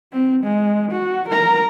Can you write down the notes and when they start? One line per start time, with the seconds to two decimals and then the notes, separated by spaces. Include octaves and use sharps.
0.13 C4
0.44 G#3
0.91 F#4
1.29 A#4 A#5